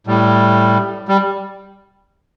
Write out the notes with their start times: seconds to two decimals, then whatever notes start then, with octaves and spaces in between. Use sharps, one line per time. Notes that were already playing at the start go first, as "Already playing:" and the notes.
0.07 A2 G3
1.09 G3